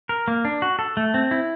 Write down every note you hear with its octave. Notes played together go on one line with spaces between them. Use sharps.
A#4
A#3
D4
F#4
A4
A3
C4
E4